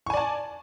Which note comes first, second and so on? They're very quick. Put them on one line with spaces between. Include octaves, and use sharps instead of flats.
C#6 G#5 D5 A5